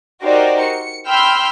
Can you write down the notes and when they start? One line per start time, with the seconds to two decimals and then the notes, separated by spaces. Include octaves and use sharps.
0.23 D#4 F#4 G4 A#4 C5 D5
0.61 C#7
1.07 G5 B5 C6 E6 F6 G6